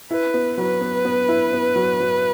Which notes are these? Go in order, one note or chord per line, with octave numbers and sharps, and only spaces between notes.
E4 B4
B3
F#3 B4
B3
B3
E4
B3
F#3
F#3